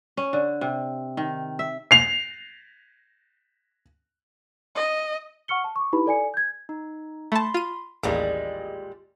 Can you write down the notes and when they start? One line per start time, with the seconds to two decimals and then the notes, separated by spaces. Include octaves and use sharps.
0.17 C#4
0.33 D3
0.61 C3
1.17 D#3
1.59 E5
1.91 C7 F7
4.75 D#5
5.48 F#5 C#6 F6 C#7 G7
5.64 A5
5.76 C#6 D6
5.93 D#4 E4 G4 B4 B5
6.06 A4 D5 G#5 C#7
6.34 G6 G#6
6.69 D#4
7.32 A3 A5 B5 C6
7.54 F4 D#7
8.03 A1 D#2 A#2 G3 G#3 G#4 D#5